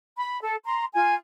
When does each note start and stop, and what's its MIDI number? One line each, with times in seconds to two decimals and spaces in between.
0.17 0.39 83
0.42 0.56 69
0.65 0.86 82
0.65 0.86 84
0.94 1.15 65
0.94 1.15 80